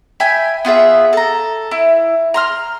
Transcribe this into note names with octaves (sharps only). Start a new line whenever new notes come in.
E5 G5 G#5 B5
B3 F4 G#4 E5
A4 A#5
E4
A#5 C6 F6